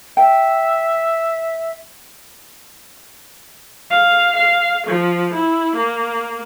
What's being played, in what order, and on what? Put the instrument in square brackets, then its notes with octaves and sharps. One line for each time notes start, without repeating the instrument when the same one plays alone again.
[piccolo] E5 [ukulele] G5
[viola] F5
F5
F3
E4
A#3